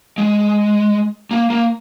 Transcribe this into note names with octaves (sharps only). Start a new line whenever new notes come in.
G#3
A#3
A#3